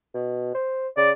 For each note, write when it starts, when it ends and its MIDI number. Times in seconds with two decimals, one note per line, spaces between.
0.14 0.53 47
0.55 0.88 72
0.97 1.12 49
0.97 1.11 74